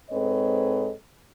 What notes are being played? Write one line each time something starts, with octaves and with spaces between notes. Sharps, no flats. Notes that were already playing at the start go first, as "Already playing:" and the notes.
G#2 C4 A4 B4 C#5 D#5